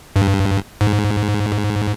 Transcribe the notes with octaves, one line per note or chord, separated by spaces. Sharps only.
G2
G#2